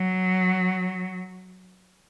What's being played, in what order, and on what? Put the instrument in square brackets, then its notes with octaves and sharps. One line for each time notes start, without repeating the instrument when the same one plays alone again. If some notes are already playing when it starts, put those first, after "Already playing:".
Already playing: [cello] F#3